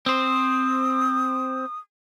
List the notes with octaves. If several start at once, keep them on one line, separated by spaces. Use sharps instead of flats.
C4 C5 D#6